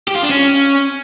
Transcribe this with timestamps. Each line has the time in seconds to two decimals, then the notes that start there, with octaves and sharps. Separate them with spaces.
0.08 G4
0.15 F4
0.23 D4
0.30 C#4